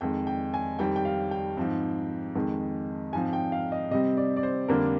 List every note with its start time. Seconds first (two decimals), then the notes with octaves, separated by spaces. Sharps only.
0.01 F2 D#3 G#3 G5
0.27 G5
0.54 G#5
0.79 F2 D#3 G3 C4 G5
0.96 G5
1.05 F5
1.31 G5
1.57 G#2 F3 C4
2.35 F2 D#3 G#3
3.13 G#2 F3 C4 G#5
3.33 G5
3.52 F5
3.72 D#5
3.91 C3 G3 C4 D#5
4.17 D5
4.37 D5
4.43 C5
4.68 F2 D3 G3 A#3 D4 A#4